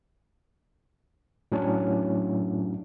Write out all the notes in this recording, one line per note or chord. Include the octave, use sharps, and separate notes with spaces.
A2 F#3 C#4 D4